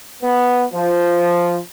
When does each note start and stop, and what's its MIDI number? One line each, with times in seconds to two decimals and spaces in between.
0.23 0.65 59
0.73 1.58 53